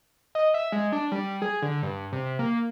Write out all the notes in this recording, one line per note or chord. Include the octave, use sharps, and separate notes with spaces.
D#5
E5
G#3
D4
G3
G#4
D3
G2
C3
A#3